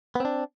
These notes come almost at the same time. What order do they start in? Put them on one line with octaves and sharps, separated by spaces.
B3 C4 D4